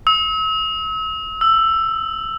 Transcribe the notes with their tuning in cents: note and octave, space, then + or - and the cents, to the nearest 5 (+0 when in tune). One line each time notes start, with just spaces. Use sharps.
E6 -40
E6 +10